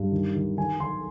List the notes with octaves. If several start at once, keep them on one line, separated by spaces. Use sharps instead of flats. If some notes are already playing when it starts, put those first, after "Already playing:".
Already playing: G2
D#3
D#3
D#3 G#5
D#3 C6